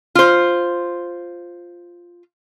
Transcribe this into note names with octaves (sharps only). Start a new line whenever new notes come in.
F4 C5